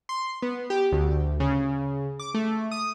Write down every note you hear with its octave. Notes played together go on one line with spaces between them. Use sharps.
C6
B3
G4
D2
C#3
D6
A3
D#6